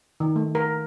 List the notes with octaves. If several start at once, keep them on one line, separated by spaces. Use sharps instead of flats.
D#3
A3
A#4